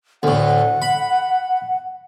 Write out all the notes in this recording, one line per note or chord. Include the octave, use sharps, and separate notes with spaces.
D2 A2 F#5
B5